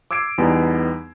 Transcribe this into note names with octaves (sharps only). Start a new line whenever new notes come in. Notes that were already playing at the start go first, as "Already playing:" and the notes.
D6 E6 G#6 C7 D7
E2 G3 B3 D#4